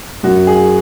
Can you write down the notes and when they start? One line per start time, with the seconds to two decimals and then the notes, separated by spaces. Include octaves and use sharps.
0.23 F#2 F#4
0.47 G#4